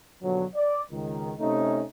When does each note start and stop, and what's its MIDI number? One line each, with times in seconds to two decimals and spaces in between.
0.22 0.44 43
0.22 0.44 47
0.22 0.44 50
0.22 0.44 53
0.22 0.44 54
0.55 0.80 74
0.91 1.32 37
0.91 1.32 51
1.39 1.83 48
1.39 1.83 57
1.39 1.83 61
1.39 1.83 63